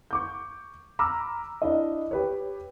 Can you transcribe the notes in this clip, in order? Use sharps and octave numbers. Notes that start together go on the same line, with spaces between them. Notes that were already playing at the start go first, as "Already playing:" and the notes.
C#6 D6 G6
A#5 B5 D6 E6 F6
D4 E4 D#5
G4 B4 C#5